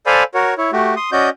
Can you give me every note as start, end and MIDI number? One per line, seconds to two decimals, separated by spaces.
0.06 0.23 69
0.06 0.23 72
0.06 0.23 74
0.06 0.23 77
0.06 0.23 80
0.06 0.23 83
0.34 0.54 66
0.34 0.54 70
0.34 0.54 73
0.58 0.71 64
0.58 0.71 73
0.73 0.95 57
0.73 0.95 66
0.73 0.95 67
0.97 1.10 84
0.97 1.10 87
1.12 1.29 61
1.12 1.29 66
1.12 1.29 74
1.12 1.29 75
1.12 1.29 91